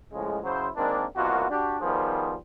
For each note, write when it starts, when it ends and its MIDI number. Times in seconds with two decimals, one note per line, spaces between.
0.12 0.38 45
0.12 0.38 49
0.12 0.38 53
0.12 0.38 56
0.44 0.67 49
0.44 0.67 54
0.44 0.67 64
0.44 0.67 72
0.75 1.04 51
0.75 1.04 56
0.75 1.04 58
0.75 1.04 60
0.75 1.04 62
1.16 1.47 36
1.16 1.47 47
1.16 1.47 58
1.16 1.47 65
1.16 1.47 66
1.49 1.77 62
1.49 1.77 66
1.49 1.77 67
1.80 2.34 51
1.80 2.34 53
1.80 2.34 55
1.80 2.34 59
1.80 2.34 68
1.80 2.34 72